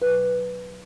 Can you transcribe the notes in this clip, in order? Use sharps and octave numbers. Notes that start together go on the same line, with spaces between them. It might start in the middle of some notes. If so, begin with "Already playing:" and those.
B2 F#3 B4